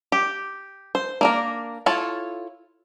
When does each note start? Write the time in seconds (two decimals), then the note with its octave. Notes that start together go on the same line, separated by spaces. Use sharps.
0.12 G4
0.95 C5
1.21 A#3 D4 A#4
1.86 E4 F4 A4 C#5 A5